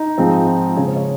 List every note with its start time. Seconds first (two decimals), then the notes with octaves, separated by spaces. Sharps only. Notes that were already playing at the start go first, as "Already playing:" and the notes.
Already playing: D#4
0.18 G#2 F3 G#3 C4
0.47 F4
0.77 C#3 G#3 C#4 G#4
0.87 C5
0.96 C#5